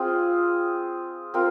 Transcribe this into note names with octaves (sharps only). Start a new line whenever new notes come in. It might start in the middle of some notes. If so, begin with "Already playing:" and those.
Already playing: C4 F4 G#4
C4 F4 A#4